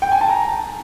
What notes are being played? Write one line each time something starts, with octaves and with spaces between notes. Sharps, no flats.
G5
G#5
A5
A#5